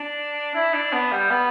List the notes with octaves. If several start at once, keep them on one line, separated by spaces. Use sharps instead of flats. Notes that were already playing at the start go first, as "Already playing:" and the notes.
Already playing: D4
E4
D4
B3
G3
B3